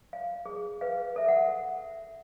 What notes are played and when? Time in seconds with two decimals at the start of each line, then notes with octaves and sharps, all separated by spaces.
0.13 F5
0.46 G#4
0.81 B4 F5
1.16 A4 E5
1.28 F#5